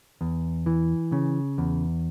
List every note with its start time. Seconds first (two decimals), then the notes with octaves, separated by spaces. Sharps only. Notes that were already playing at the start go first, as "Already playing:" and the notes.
0.21 E2
0.66 E3
1.12 C#3
1.58 E2